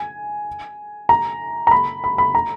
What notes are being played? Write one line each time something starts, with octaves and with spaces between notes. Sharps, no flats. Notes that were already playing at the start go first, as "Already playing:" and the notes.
Already playing: G#5
A#5
A#5
B5
B5
B5
A#5